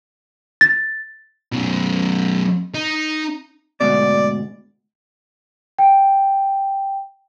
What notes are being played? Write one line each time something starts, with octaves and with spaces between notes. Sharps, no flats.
A6
F#2 B2
D#4
D2 G#2 B2 D5
G5